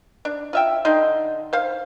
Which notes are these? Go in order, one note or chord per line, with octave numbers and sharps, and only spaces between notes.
D4
F4 E5 G5
D3 D#4 C6
C5 F5